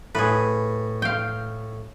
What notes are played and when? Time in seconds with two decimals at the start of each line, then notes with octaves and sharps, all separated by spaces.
0.15 A2 G#4 B4
1.02 F5 G5